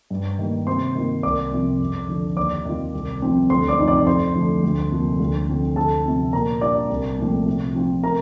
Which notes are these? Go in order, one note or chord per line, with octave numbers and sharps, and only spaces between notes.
G2
D#3 G3 A#3
C3 C5 C6
D#3 A#3 F4
C2 D5 D6
C3 F3
F2
D3 F3
D#2 D5 D6
D#3 G3 C4 F4
C2
C3 F3 C4
D2 C5 C6
D5 D6
C3 F3 C4 D#4
D5 D6
F2 C5 C6
D3 F3 A3
D2
C3 F3 A#3
D2
D3 F3 C4
D2 A4 A5
C3 F3 C4
A#2 A#4 A#5
G3 D4 F4 D5 D6
C2
A#2 F3 A3 C4
C3
F3 C4 F4
C3 A#4 A#5